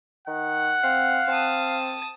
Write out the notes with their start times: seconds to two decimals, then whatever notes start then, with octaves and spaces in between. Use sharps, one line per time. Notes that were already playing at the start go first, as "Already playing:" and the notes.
0.27 D#3 F#5
0.84 C4 F5
1.28 C4 A5 D#6